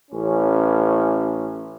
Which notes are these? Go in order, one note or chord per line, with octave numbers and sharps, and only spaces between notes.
A1 C#4